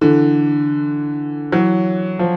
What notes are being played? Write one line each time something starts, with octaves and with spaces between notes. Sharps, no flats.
D3 E3
E3 F#3
F3